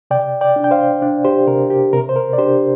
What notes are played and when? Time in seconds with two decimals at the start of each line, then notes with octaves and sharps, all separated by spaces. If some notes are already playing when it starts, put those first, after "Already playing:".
0.11 C3 D5 G5
0.41 D5 G5
0.56 D4
0.64 G5
0.71 C5 F5
1.02 D4
1.25 G4 C5
1.48 C3 A#4
1.70 G4
1.93 C3 A#4
2.09 C5
2.16 A#4
2.33 D5
2.38 D4 G4 C5